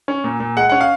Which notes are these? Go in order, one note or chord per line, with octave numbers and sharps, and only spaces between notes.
C#4
A#2
A#2
G#3 F#5
C#4 F#5
F5